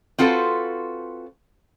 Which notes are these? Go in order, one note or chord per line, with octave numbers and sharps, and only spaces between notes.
C4 F4 F#4 A4 B4 C5